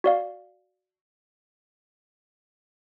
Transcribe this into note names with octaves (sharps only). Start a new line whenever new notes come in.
F#4 D5 F5